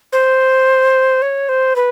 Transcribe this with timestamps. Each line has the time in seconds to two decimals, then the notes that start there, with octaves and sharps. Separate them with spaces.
0.13 C5
1.22 C#5
1.49 C5
1.76 B4